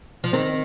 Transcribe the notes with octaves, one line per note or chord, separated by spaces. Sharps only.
F3
D#3 C4